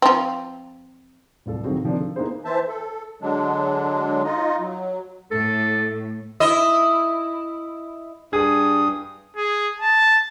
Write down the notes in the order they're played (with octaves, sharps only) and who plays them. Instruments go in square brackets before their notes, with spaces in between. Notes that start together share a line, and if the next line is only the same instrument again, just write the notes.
[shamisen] F3 C4
[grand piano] D1 C2 F4 A4
D#3 F#3 C4 F#4 G#4
D3 D#3 F3 A#3 C4 D4
A4
A#3 B3 D#4 E4 G#4 C5
[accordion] E3 C5 E5 A5
A4
D3 F#3 G#3 D4
D#4 F4 D#5
F#3
[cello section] A2 [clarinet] A4
[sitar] E4 D#5
[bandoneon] G2 D#6 [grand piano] G#4
[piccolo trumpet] G#4
A5